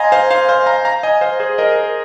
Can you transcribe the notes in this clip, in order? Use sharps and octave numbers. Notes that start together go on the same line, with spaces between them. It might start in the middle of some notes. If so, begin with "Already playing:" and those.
Already playing: D#5 F5 G#5 A#5 C6
C5 F5
C5 F5
C5 F5
F5 A#5
F5 A#5
D#5 G#5
C5 F5
G#4 C5
A#4 D#5
A#4